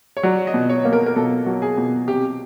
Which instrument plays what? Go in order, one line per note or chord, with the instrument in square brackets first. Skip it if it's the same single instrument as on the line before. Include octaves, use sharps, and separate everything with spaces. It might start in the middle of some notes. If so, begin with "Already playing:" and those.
[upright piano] C#5
[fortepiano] F#3 [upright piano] D5
[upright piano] D#5
[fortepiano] B2
[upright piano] C#5
[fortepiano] A#3
[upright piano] A#4
A#4
[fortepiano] B2 [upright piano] A4
[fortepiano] F#3
[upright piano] G#4
[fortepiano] B2
[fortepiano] C3 [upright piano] G4